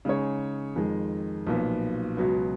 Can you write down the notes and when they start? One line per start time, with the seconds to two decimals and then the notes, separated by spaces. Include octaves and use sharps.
0.05 C#3 G#3 D#4 G#4 C#5
0.76 F2 D#3 G#3
1.47 B1 A#2 F3 B3
2.17 C#2 B2 F#3 B3